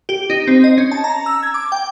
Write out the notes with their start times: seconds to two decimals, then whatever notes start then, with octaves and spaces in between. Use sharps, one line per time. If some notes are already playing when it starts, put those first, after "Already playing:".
0.09 G4
0.30 D#4
0.47 C4
0.64 D#5
0.78 C#4
0.92 A5
1.04 A#5
1.26 E6
1.43 G#6
1.54 D6
1.72 G5